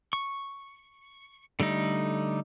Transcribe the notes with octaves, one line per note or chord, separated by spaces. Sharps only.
C#6
D3 G3 A3 D#4